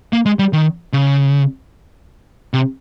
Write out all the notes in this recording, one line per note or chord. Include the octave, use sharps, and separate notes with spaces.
A#3
G#3
G3
D#3
C#3
C3